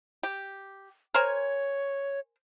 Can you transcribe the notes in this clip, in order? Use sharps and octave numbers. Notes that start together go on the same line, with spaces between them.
G4
A#4 C5 C#5 G#5